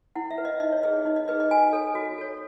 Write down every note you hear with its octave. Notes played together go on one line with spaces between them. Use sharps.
E4 F#5
E5
B4
D#5
D#4 D#5
C#5
G#4 B4 D#5
D#4 D#5
D#5
G#4 B4 D#5
D#5
F#4 G#5
A4 C#5
F#4
A4 C#5